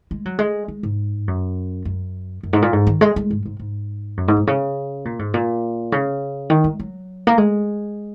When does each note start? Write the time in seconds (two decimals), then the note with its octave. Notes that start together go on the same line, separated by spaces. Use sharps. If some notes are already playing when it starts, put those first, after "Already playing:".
0.11 G#3
0.25 F#3
0.39 G#3
0.68 G#3
0.83 G#2
1.28 F#2
1.85 F#2
2.43 F#2
2.53 G#2
2.62 A#2
2.73 G#2
2.87 D#3
3.01 G#3
3.16 G#3
3.31 G#2
3.46 G#2
3.59 G#2
4.17 F#2
4.28 G#2
4.37 A#2
4.47 C#3
5.05 A#2
5.19 G#2
5.34 A#2
5.92 C#3
6.50 D#3
6.64 G#3
6.80 F#3
7.27 A#3
7.38 G#3